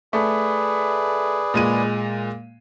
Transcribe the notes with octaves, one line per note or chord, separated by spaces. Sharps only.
A3 G#4 B4 D5
A#2 G#3 D#7